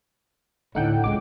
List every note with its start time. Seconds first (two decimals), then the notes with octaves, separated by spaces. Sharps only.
0.75 D2 A2 D3 A3 D#4 F#5 G5
1.04 D1 C#2 G#3 D6